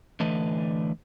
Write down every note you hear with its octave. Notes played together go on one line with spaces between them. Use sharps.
D3 E3 A3 B4 D#5